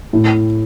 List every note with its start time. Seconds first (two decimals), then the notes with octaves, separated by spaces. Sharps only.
0.13 A2